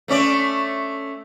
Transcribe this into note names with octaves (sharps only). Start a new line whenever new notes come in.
A3 C#4 D5